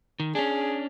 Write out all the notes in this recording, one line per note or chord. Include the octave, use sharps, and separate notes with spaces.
D#3
C#4 D4 G#4